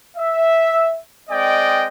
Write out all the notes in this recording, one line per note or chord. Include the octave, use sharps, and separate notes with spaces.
E5
G#3 C4 D5 D#5 G5